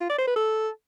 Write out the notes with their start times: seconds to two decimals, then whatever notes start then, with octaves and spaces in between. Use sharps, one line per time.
0.01 F4
0.10 D5
0.18 C5
0.27 B4
0.36 A4